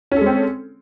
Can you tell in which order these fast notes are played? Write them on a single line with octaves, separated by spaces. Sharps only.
C#4 A4 G#3 C4